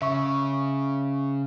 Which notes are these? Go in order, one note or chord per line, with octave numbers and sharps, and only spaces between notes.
C#3 E5 C#6